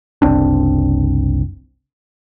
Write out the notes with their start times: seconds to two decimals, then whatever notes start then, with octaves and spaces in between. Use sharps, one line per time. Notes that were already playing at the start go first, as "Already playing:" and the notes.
0.22 F#1 C2 C4 D4